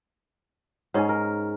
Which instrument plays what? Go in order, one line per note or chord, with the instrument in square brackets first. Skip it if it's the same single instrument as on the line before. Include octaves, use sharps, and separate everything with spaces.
[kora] G#2 C#4 [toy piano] D#4 C#5 F#5
[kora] A#4